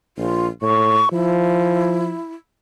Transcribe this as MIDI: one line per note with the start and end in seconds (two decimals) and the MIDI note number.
0.18 0.48 34
0.18 0.46 65
0.62 1.00 45
0.62 1.09 85
1.12 2.15 53
1.12 2.34 64